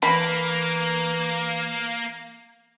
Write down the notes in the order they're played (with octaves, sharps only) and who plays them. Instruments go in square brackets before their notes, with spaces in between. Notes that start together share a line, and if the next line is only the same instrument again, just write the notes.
[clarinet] E3 [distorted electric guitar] A#3 [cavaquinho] B5